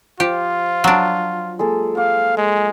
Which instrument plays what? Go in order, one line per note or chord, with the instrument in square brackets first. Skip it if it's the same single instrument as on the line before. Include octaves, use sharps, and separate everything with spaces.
[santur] F3 [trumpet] F4 [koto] G4
[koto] F#3 D4
[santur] G#3 A#3 A4
[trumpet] F5 [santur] D6
[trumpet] G#3